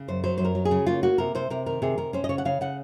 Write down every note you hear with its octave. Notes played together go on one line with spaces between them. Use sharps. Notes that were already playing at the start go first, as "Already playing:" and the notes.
Already playing: C#3
F#2 C5
F#3 C5
F#2 C5
A#4
F#3
G#4
C#3
A#3 F4
A#3 F#4
C3 A#4
C3 C5
C3 A#4
D#3 A#4
C3 G#4
C3 A#4
C#4 C5
D#5
C#3 C#5
F#5
C#3 F5
C#3 F#5